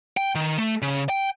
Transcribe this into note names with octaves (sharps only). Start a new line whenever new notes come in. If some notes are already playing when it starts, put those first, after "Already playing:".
G5
D#3
A3
C#3
G5